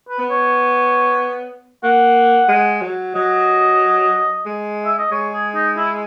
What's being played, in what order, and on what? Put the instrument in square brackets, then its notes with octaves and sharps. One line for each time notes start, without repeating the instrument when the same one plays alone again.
[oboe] B4
[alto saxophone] B3
[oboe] C#5
[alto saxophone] A#3 [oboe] F#5
[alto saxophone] G#3
F#3
[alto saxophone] F#3 [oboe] D#5
[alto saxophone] G#3
[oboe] E5
D#5
[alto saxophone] G#3 [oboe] C#5
[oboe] G#4
D#4
E4